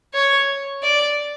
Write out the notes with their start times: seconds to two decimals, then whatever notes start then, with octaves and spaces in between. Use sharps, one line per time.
0.14 C#5
0.83 D5